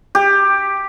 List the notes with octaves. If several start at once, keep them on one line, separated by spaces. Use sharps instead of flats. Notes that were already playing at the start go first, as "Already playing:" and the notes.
G4